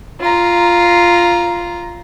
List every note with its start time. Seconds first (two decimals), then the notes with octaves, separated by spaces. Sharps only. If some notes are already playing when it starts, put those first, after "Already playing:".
0.21 F4 A#5